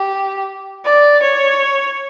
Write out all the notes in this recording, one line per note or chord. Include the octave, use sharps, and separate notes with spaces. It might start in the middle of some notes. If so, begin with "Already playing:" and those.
Already playing: G4
D5
C#5